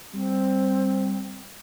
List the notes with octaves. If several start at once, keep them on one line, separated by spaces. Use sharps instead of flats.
G3 C4